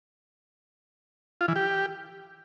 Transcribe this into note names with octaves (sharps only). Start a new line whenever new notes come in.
F4
E3
G4